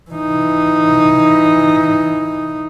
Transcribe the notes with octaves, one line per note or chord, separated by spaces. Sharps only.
E3 D#4